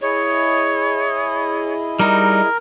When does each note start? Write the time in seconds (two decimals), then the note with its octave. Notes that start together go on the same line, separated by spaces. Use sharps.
0.01 E4 G#4 C#5 D#5
1.99 G3 D#4 A#4